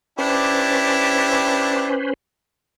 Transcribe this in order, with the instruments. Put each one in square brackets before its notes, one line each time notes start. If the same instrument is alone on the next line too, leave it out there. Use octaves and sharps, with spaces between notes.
[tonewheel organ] C#4 B4 C5 [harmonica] D4 E4 G4